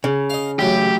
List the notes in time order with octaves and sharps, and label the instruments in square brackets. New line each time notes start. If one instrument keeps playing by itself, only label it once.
[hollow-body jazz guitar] C#3
[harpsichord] D#5 F5
[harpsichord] A1 E3 F#3 [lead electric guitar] G4